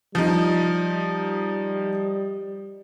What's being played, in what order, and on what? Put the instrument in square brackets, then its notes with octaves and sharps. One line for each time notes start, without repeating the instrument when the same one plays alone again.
[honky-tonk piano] F3 D#4 [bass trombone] G3